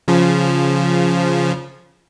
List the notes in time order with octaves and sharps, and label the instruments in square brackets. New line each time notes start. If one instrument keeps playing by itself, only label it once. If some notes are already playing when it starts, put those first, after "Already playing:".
[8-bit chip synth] C#3 F3